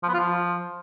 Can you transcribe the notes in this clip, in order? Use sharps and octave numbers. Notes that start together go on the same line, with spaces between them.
F3
B3
F4
F3